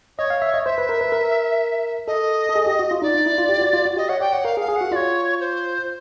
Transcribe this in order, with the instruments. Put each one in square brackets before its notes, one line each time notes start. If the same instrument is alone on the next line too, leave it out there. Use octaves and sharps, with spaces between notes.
[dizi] C#5 [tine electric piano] D#5
[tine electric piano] F5
E5
D#5
[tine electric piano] C5 [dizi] E5
[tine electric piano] B4
A#4
B4
A#4
[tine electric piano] A4 [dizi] D#5
[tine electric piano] A4
G#4
G4
F#4
F4
[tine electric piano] D#4 [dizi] D5
[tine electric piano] D#4
E4
F4
G4
F#4
F4
F#4
[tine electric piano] G4 [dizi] D#5
[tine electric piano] C#5 [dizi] F#5
[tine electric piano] D5 [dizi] G5
[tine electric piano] C#5 [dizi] F#5
[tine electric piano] A#4 [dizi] F5
[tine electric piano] G#4
[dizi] F5
[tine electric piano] G#4
[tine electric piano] F#4 [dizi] F#5
[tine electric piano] F4 [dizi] D5
[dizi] C#5
C5